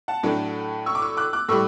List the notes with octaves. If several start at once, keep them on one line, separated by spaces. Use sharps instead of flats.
F#5 A5
A2 F#3 A3 D4
C#6 E6
D6
C#6 E6
D6 F#6
D6 F#6
A2 G3 C#6 E6